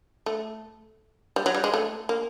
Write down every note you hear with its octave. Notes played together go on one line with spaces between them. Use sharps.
A3
G3
F#3
G3
G#3
A3
A#3